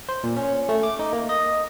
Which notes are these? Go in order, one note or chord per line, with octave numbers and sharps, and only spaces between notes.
C5
A#2
C#4
A3
D6
D#4
A#3
D#5